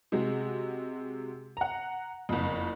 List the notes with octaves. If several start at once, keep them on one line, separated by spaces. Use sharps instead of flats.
C3 G#3 F#4
F#5 A#5
F#1 F2